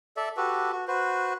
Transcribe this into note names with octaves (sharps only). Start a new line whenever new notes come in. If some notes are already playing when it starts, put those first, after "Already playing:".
A4 D5 E5
F#4 G4 A4 B4
F#4
F#4 B4 C5